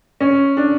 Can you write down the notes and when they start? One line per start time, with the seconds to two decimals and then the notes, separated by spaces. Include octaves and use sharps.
0.21 C#4
0.57 D4